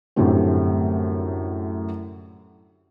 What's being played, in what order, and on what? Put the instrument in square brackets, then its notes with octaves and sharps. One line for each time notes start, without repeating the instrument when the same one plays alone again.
[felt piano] F#2 A2 D3 G3 A3 C4